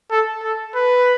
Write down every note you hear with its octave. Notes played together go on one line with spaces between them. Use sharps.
A4
A4
B4